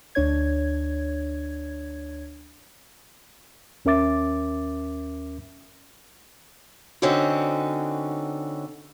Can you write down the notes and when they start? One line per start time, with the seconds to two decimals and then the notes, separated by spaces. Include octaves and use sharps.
0.15 D2 D4 C#5 G#6
3.85 D#2 C#4 A#4 E5 D6 A6
7.02 D3 C4 C#4 D#4 F#4